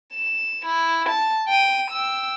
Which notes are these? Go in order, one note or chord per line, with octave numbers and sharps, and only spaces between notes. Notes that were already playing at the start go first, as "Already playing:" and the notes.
E7
E4
A5
G5 D#7
G5 E6